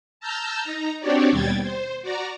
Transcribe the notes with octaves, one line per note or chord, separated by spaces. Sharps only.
A5 A#5 E6 F6 G6
D#4 A#5
C4 D4 F#4 G4 C#5 D5
D#2 B2 G3 G5 G#6 A6
C5
F#4 D5 A#5